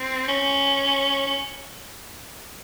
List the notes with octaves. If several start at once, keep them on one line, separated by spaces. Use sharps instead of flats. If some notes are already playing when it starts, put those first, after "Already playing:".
Already playing: C4
C#4
C#4